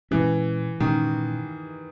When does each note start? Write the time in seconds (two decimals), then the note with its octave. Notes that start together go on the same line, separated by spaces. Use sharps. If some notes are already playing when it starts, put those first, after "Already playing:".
0.11 A#2 E3 G#3 C#4
0.80 A#2 D#3 G#3 C#4